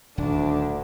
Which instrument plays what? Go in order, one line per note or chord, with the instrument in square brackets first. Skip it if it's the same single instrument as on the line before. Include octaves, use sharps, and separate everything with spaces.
[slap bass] D#1 [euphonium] D2 [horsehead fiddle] D4